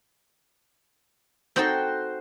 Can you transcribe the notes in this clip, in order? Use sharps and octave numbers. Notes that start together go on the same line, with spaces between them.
C4 D#4 F#4 A4 C5 G5